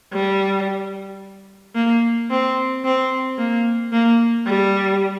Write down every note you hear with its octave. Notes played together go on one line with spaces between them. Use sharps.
G3
A#3
C4
C4
A#3
A#3
G3